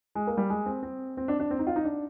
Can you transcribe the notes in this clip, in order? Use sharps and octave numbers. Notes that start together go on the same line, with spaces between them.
G#3
A#3
G3
G#3
C4
C4
C4
D4
D4
C4
D#4
F4
D#4
D4